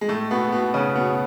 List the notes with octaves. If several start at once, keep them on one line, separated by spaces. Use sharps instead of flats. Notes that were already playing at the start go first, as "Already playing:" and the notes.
G#3
A2 A3
B2 B3
B2 B3
C#3 C#4
B2 B3